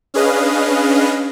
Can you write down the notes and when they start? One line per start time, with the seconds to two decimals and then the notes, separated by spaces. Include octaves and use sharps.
0.14 C#4 D4 G#4 B4 D#5 F5